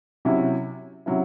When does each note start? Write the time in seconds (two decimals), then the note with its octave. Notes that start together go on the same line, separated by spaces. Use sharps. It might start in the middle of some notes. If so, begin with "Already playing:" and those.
0.25 C3 F#3 C#4 E4
1.06 C3 F#3 C#4 E4